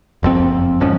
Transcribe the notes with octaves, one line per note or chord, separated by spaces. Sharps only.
F#1 F2 G#2 C4
G1 G#2 F3 C#4